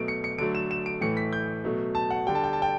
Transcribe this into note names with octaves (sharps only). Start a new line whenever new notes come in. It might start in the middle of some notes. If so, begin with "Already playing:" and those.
Already playing: B2 F#3 A3 D7
C#7
C#7
D3 F#3 A3 D7
E7
E7
D7
A2 E3 A3 C#7
B6
G6
B2 F#3 A3
A5
F#5
D3 G3 G5
A5
G5
A5
G5